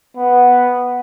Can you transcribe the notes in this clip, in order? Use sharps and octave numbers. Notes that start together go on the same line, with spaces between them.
B3